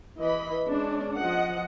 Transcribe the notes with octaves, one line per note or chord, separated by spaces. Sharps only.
E3 D#5 B5
G#3 C#4 D4
F3 D#5 F#5